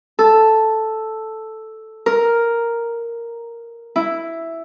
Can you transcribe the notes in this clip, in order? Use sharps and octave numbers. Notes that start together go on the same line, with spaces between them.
A4
A#4
E4